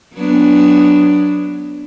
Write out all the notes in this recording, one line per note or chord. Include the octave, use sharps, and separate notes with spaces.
F#3 B3 D4